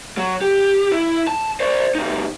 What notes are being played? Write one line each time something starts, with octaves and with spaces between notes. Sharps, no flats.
F#3
G4
E4
A5
C5 D5
C2 D#4